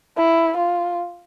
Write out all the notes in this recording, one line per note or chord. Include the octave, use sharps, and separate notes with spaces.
E4
F4